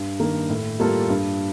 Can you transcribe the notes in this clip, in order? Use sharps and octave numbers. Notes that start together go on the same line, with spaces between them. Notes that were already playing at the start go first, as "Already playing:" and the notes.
Already playing: G2
D#3 A#3
A2
G3 A#3 F4 A4
G2